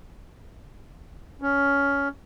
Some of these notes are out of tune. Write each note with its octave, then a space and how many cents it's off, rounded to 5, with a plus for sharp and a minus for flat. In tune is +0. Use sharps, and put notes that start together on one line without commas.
C#4 +15